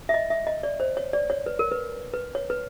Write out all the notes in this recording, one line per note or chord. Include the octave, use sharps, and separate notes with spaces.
E5
D#5
E5
D#5
D5
C5
C#5
D5
C#5
B4
A#4
B4
B4
C#5
B4